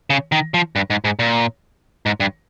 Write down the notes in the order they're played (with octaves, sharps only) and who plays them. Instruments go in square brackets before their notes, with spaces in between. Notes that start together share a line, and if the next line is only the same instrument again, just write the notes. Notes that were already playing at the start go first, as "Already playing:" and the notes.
[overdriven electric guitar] C#3
D#3
F3
G2
G#2
G#2
A#2
G#2
G2